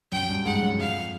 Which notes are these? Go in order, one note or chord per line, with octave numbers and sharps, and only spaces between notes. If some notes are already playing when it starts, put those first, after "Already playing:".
F#2 G5
G2
G#2 F#5
F#2
F2 F5